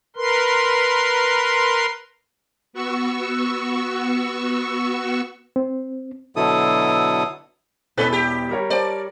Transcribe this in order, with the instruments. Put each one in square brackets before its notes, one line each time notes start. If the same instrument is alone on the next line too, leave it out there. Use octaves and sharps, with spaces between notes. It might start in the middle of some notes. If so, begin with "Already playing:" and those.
[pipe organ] A#4 B4 C6
[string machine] B3 F#4 C#6 E6
[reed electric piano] C4
[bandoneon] B2 D3 F#3 E4 A4 D#6
[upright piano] E1 B2 G7 [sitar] C4 B4 [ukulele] E4 A4 D5
[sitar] G4
[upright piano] G3 A#4 C#5
[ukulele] C5 A5 [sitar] D5